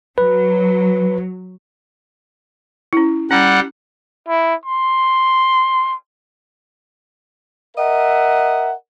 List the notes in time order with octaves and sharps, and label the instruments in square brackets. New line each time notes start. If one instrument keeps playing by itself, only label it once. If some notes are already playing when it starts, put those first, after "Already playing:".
[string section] F#3 [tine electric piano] B4
[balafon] C#4 E4
[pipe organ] G3 F#5 [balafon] C#4
[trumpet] E4
C6
[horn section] A#4 D#5 E5 F#5